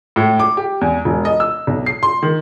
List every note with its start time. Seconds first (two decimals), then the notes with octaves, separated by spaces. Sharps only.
0.16 A2
0.40 D6
0.57 G4
0.81 E2
1.05 E1
1.25 D#5
1.40 E6
1.67 B1
1.86 C7
2.03 C6
2.23 D#3